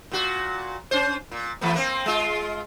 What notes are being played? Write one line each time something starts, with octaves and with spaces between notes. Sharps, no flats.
A#2 F#4
C#4 C5
A#2
E3 A3 B3
A#3 C4
G#3 F4